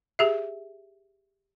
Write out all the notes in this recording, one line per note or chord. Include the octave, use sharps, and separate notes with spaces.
G4 G#4 E5